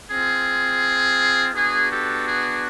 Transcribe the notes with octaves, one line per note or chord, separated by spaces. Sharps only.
C4 F4 G#4
B3 D4 F#4 G#4
G4 A4
G#4